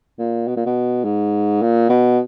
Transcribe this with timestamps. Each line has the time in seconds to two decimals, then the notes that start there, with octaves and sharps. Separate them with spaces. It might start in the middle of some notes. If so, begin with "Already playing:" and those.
0.19 A#2
0.47 B2
0.56 A#2
0.66 B2
1.04 G#2
1.62 A#2
1.89 B2